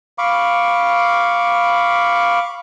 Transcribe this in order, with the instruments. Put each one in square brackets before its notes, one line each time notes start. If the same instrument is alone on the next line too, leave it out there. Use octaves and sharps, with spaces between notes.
[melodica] F5 B5 C#6 D6